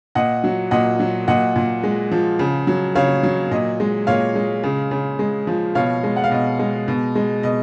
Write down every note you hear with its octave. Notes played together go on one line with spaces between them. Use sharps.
A#2 D#5 F#5
F#3
A#2 D#5 F#5
F#3
A#2 D#5 F#5
A#2
G#3
F3
C#3
F#3
C#3 C#5 F5
F#3
A#2 D#5
G#3
A#2 C#5 F5
G#3
C#3
C#3
G#3
F3
B2 C#5 F5
G#3
F#5
F5
B2 D#5
G#3
B2
G#3
B2 D#5